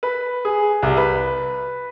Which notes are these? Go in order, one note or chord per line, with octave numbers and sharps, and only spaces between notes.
B4
G#4
C2
B4